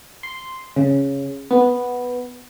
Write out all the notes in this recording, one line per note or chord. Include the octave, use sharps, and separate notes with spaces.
C6
C#3
B3